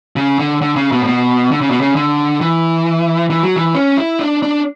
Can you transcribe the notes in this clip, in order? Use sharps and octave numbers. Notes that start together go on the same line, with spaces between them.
C#3
D3
D3
C#3
B2
A2
B2
D3
C#3
B2
C#3
D3
E3
E3
F#3
E3
C#4
E4
D4
D4